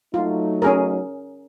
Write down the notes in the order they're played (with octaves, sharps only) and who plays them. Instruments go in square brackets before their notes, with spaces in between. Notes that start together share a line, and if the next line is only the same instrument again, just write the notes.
[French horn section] F#3 A3 D#4 [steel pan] F4
[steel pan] C#4 G#4 A#4